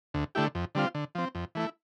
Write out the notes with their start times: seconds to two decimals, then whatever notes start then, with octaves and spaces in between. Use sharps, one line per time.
0.14 D2
0.35 D3 A3 E4 G4
0.55 F2
0.75 D3 G3 C4 F4
0.95 D3
1.15 F3 C4
1.35 F2
1.55 E3 A3 E4